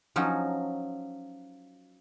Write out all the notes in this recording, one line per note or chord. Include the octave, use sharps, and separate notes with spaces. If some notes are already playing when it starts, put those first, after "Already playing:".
F3 F#3 C#4 D#4